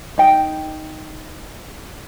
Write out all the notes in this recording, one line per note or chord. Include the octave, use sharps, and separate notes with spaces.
D#4 G5